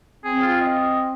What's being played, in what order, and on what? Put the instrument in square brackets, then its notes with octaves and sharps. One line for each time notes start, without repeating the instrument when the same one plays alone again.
[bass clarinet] C4 [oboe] G#4
[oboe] F4
D#5